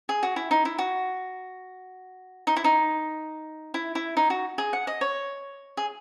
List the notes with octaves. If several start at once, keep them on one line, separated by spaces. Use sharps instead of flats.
G#4
F#4
E4
D#4
E4
F#4
D#4
E4
D#4
E4
E4
D#4
F#4
G#4
F#5
D#5
C#5
G#4